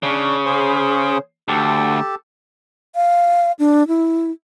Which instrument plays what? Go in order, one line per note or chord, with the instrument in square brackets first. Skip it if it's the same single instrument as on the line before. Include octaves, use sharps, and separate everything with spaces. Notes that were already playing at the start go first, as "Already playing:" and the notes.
[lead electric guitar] C#3 [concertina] D4 C#5
[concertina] G#4 C5
[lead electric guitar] D2 [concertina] G4 A4 A5
[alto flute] F5
D4
E4